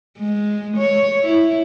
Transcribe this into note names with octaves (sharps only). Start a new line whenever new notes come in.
G#3
C#5
E4